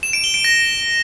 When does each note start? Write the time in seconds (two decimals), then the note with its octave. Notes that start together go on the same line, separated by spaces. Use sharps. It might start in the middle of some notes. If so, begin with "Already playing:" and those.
0.03 E7
0.13 D7
0.24 G7
0.34 D7
0.44 A#6